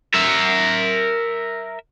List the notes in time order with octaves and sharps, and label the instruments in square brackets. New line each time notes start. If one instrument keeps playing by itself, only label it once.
[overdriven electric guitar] A#4 E5